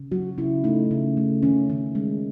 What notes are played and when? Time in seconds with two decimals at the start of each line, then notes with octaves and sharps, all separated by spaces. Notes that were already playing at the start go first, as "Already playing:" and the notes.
Already playing: C#3
0.12 F#3 F#4
0.38 C#3 E4
0.64 A3 D#4
0.91 C#3
1.17 A3
1.42 D#3 C#4
1.70 D#3
1.95 G#3